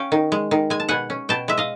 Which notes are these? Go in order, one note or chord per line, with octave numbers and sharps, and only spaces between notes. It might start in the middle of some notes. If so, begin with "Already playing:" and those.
Already playing: C#4 F5 G5
D#3
G#3
D#3
G#3 G#5
A5
B2 F#5 G#5
C#4
B2 G5 A5
G#3 E5
D#5 F5